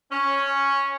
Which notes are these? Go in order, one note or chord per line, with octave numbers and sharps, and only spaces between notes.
C#4